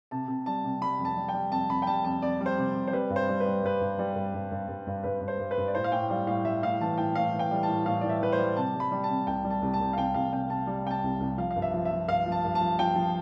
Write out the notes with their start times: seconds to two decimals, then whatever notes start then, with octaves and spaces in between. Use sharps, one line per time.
0.11 C3 A5
0.28 C3
0.46 G3 A5
0.64 C3
0.81 G3 B5
0.99 F2
1.05 A5
1.17 G3
1.28 G5
1.34 G3
1.51 F2 A5
1.69 F2 B5
1.82 G5
1.87 G3 A5
2.04 F2 A5
2.22 F2 D5
2.41 G3
2.46 C5
2.58 C3
2.75 C3
2.88 C5
2.93 G3 B4
3.10 G2
3.16 C5
3.29 G3
3.40 B4
3.45 G3
3.63 G2 B4
3.81 G2
3.99 G3
4.15 G2
4.34 G2
4.52 G2
4.68 G2
4.87 G2
5.04 G2 B4
5.21 G2
5.28 C5
5.39 G2
5.51 B4
5.58 G2
5.68 D5
5.75 A2 C5
5.84 F5
5.92 A2 G5
6.10 G3 F5
6.27 A2 F5
6.45 G3 E5
6.63 A2 F5
6.81 E3 A5
6.98 A2 G5
7.15 A2 F5
7.33 E3
7.39 G5
7.51 G3
7.63 A2 A5
7.86 A2 F5
8.01 E3 D5
8.09 E5
8.21 E3 B4
8.32 C5
8.38 G3
8.56 C3 A5
8.74 G3
8.80 B5
8.92 G3
9.04 A5
9.09 C3
9.27 C2 G5
9.44 G3
9.50 A5
9.62 C2
9.74 A5
9.80 C2
9.93 F5
9.97 C2 G5
10.14 C2 F5
10.32 C3 G5
10.50 C3 A5
10.67 G3
10.85 C3 G5
10.91 A5
11.04 C2
11.20 C2
11.38 F3 F5
11.51 F5
11.56 G2
11.62 E5
11.74 F3
11.85 E5
11.91 F3
12.08 G2 F5
12.26 F3
12.32 A5
12.44 G2
12.55 A5
12.61 F3
12.79 F3 G5
12.96 F3